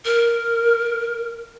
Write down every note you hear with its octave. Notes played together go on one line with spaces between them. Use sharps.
A#4